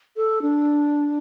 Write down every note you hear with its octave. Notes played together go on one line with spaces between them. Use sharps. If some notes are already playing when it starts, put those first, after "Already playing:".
A4
D4